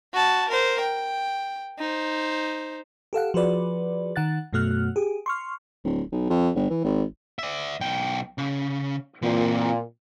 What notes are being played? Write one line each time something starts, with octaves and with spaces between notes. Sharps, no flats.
F#4 A5
A#4 C5
G5
D#4 C5
G4 A4 F5 F#5
F3 F#4 G#4 B4 D5
D#3 F#5 F#6 A6
F#2 B2 A3 F#4 F6 F#6
G4 G#4
C6 C#6 F6
D1
B1
F2
G1
E3
G#1
D5 E5
B1 G5
C#3
A#2 E3 C4